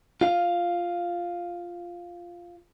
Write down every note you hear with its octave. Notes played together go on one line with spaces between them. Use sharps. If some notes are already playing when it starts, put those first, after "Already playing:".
F4 F5